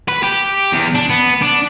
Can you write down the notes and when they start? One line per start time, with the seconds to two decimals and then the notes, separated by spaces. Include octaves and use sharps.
0.08 B4
0.23 G4
0.72 E2
0.95 D4
1.10 B3
1.42 D4